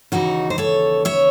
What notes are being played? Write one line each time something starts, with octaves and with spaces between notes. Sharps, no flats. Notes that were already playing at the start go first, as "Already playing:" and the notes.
D#2 C#3 E3 D#4 F#4
C5
A4 C#5
C#5 E5